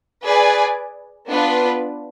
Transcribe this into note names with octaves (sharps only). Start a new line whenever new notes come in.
G#4 B4 D5 G#5
B3 D4 F4 B4